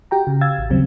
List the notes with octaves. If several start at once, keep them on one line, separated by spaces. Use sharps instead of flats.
F#4 G4 G5 A#5
C#3
F5 E6 G#6 A6
A1
D#2 C#3 F#3 G3 C4